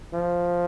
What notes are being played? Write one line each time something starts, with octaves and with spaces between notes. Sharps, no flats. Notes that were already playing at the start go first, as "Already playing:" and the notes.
F3